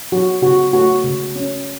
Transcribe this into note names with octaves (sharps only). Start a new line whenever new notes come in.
F#3 F#4
C#3 F#4
A3 F#4
C#3
C#4